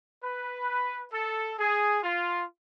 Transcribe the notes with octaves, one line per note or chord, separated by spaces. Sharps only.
B4
A4
G#4
F4